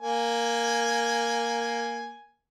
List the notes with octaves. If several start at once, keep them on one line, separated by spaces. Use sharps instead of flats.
A#3 G#5